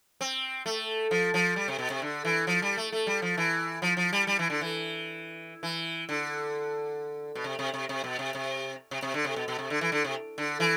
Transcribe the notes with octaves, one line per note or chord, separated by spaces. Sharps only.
C4
A3
F3
F3
G3
C3
B2
C3
D3
E3
F3
G3
A3
A3
G3
F3
E3
F3
F3
G3
G3
E3
D3
E3
E3
D3
B2
C3
C3
C3
C3
B2
C3
C3
C3
C3
D3
C3
B2
B2
C3
D3
E3
D3
C3
D3
E3